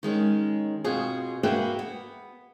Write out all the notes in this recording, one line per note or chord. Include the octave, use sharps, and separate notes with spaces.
D#3 G#3 C#4
B2 C4 F4 G#4
A#3 F#4 G#4 B4 E5 G5
B3